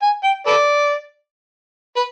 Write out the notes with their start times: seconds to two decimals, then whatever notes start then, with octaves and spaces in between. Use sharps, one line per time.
0.02 G#5
0.24 G5
0.47 A4 B4 D5
1.96 B4